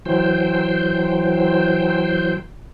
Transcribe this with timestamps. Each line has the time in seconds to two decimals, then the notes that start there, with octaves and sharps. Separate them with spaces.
0.05 E3 F#3 C5 G5